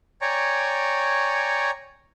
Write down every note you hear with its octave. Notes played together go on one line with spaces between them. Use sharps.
C#5 D5 G5 G#5 A#5 C#6